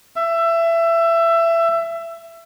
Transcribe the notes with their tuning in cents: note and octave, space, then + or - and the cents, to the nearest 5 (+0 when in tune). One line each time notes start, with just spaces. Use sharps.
E5 +20